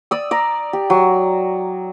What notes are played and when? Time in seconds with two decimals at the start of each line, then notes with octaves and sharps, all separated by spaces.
0.11 D5 D#6 E6
0.31 D5 A#5
0.73 G4
0.90 F#3